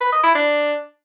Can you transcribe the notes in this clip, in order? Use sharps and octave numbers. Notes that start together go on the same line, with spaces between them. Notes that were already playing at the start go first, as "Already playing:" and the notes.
B4
D#5
E4
D4